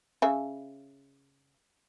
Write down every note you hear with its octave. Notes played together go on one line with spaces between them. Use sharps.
C#3 E5